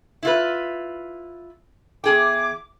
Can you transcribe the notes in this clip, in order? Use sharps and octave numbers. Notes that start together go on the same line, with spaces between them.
E4 F4 B4
E2 G#4 G5 D6